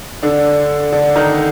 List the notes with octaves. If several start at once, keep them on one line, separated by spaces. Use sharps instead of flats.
D3 D4
D3 D4
D#3 D#4